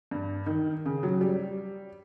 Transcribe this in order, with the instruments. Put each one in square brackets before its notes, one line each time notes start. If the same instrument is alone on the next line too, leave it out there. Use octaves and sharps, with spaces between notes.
[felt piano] G2
D#3
C#3
F#3
G3